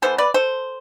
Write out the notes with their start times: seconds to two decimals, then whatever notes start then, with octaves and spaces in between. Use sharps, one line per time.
0.02 E3 B3 A4 C5
0.18 B4 D5
0.34 A4 C5